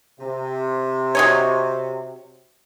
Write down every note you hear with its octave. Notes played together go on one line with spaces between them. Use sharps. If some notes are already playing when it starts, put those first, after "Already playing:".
C3
F#3 D#4 C#5